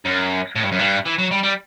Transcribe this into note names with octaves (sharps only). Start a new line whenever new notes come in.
F#2
A2
G2
F#2
G2
E3
F#3
G3
G3